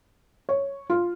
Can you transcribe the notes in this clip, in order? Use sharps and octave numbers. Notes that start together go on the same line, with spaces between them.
C#5
F4